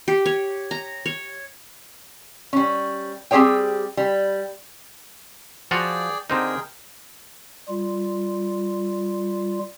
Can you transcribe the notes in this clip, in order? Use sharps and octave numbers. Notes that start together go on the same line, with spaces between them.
G4
C#5
A#5
C#5
G3 C#4
G3 C4 G4 G#4 C#5 G5
G3
F3 F4 F#4 G#4 D5 G5
D3 C4 D#4 G#4 A#4 G5
G3 F4